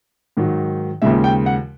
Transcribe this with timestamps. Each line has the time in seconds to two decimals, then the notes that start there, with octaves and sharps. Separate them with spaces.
0.37 G#2 D#3 F#3
1.02 D#2 C#3 F3 G#3 E5
1.24 G5
1.46 F#5